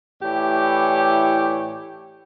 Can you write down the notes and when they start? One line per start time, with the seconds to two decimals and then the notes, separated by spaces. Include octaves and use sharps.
0.22 A2 E3 E4 G4 C#5 D5